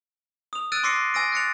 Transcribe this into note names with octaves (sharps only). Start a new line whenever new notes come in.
D#6 F7
E6 F#6 A6 D7 D#7
C6 D6 E6 A#6 C7 C#7
G#5 E6 A#6 D7
F#6 A6 C#7 F7